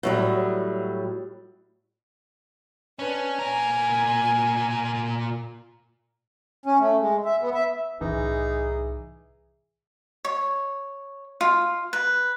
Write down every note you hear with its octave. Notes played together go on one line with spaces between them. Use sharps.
A2 F#3 G3
C#4 D4 B4
A#2 A#4 G#5
C#4
A3
G#3
E5
B3
E5
C2 A2 E3 D#4 G#4
C#5
F4
B4